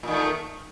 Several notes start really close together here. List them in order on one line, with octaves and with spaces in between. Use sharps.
A#2 D#3 A3